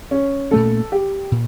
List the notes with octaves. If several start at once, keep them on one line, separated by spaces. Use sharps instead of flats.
C#4
A#2 A3 C#4 A4
G4
A#2